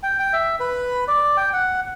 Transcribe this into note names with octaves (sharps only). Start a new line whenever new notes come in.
G5
G5
E5
B4
D5
G5
F#5